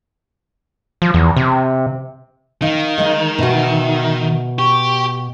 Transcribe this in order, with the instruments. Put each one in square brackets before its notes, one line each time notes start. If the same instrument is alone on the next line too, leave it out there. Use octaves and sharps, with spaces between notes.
[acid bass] F3
E2
C3
[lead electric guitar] D#3 [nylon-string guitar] D#4 [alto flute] F5
[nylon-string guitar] G#3 D#5
[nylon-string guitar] B2 F#4 [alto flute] E5
[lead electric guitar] G4 [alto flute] C#6